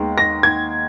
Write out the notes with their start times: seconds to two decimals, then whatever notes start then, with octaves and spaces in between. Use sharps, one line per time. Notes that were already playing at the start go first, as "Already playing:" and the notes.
Already playing: D#2 D#3 G#3 B3
0.18 A#6
0.43 G#6